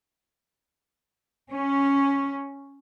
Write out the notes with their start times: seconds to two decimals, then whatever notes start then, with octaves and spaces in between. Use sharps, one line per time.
1.51 C#4